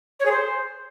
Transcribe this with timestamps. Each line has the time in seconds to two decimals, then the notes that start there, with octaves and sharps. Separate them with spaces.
0.19 C#5
0.25 G#4
0.31 C5